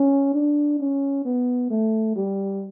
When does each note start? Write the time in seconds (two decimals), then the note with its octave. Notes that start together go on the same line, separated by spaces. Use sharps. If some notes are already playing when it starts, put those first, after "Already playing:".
Already playing: C#4
0.34 D4
0.80 C#4
1.25 B3
1.70 A3
2.16 G3